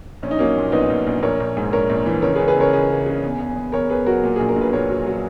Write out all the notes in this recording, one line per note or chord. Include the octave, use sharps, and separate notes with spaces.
A#1 C#4
D#4
F#3 A#3 C#4
A#2
A#1 B3 D#4
A#1
A#1
A#1 A#4 C#5
A#1
G#2
A#1 A#4 C#5
A#1
E3
C#2 A#4 C#5
G#4 B4
C#2
G#4 B4
C#2 A#4 C#5
C#2 G#4 B4
C#3
C#3
E2
E2
E2
E2 A#4 C#5
E2 G#4 B4
F#3 F#4 A#4
A#2
A#1 G#4
A#4
A#1
B4
A#2 A#4 C#5
F#3
F#3